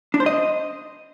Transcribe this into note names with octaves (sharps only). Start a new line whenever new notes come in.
D4
C5
D#5